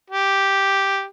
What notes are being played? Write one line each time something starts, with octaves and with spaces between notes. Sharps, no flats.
G4